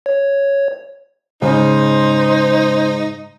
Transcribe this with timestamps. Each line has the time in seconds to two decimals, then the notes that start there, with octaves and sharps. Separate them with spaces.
0.06 C#5
1.42 G#2 C#3 D#4 C5